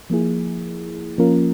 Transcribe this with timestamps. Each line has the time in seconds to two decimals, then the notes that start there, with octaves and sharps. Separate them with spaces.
0.10 F3 A#3 E4 G#4
1.18 F3 A#3 C#4 F4 A#4